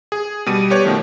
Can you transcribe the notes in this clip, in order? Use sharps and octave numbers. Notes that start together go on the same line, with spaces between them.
G#4
B2 G3 D#7
G4 B4 C#5 D5
B2 D#3 F3 A3